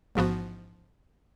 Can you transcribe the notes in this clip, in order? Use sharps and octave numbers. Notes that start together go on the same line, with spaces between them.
A1 G#2 F3 B3 F#4